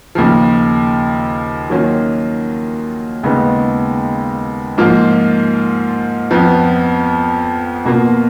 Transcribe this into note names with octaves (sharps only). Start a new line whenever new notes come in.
D#2 C#3 F3
D#3 F#3 A#3 C#4 F4
D#2 C#3 G#3 B3 D#4
G#2 F3 A#3 F4
F2 F3 B3
B2 A#3 F4